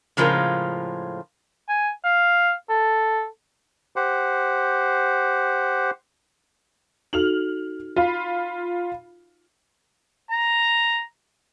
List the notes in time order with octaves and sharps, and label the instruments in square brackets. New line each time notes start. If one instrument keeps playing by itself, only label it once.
[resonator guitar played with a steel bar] A2 C#3 F3 G#3 F4 A#4
[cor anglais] G#5
F5
A4
[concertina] G4 C5 F#5
[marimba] D#4 F#4 A4 [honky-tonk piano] F6 F7 F#7
[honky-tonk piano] F4 F5 B5
[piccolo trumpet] A#5